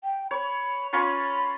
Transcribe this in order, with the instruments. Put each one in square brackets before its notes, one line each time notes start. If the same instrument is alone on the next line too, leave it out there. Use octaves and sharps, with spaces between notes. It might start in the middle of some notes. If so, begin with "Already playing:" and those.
[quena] G5
[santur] C#5 [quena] B5
[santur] C#4 F4 C#6 [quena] B5